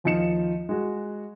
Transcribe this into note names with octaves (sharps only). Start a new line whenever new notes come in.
D#2 F3 D#4 C#7 E7
G#3 F#4